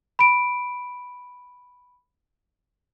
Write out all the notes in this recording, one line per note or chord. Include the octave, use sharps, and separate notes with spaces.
B5 D7